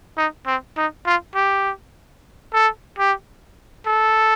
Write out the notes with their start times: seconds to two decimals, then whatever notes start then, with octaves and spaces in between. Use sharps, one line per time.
0.18 D#4
0.47 C4
0.77 D#4
1.06 F4
1.35 G4
2.54 A4
2.99 G4
3.87 A4